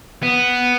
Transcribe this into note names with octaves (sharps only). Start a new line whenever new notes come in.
B3